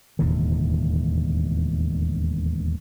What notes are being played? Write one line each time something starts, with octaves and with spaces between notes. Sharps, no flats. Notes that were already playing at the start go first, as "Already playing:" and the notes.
E1 D#2 A2 D3